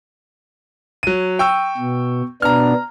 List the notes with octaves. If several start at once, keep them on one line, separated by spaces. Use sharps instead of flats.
F#3 D#7
G5 C#6 E6
B2
B2 B3 D4 A#5 F6